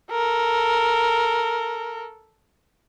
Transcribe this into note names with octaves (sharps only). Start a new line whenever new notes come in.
A4 A#4